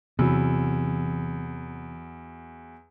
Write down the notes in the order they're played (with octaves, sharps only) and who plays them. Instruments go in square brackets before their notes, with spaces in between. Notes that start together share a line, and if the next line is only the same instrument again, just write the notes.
[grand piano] E2 F#3 [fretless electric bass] C3 [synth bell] E3